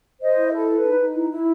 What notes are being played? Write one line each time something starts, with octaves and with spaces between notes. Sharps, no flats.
C5 D#5
E4
A4
B4
D#4
D#4
E4
E4